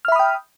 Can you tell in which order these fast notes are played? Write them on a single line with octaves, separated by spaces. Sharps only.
F6 E5 B5 D#6 G5